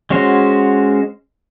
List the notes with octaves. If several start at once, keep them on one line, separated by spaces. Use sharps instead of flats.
G#3 C#4 F#4 C5